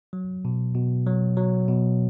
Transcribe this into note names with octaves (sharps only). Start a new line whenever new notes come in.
F#3
B2
B2
F#3
F#3
B2